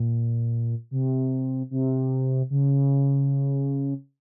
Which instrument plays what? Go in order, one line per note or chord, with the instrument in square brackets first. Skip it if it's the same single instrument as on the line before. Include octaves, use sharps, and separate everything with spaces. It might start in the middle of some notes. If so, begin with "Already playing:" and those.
Already playing: [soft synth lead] A#2
C3
C3
C#3